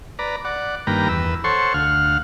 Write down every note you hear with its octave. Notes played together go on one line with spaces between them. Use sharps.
B4 D5 A#5
D5 F#5
G2 D#3 A#3 B4 G5 A#5
E2 B4 E6
A4 C5 C#5 F#5 C6 C#6
D2 F5 F#5 F6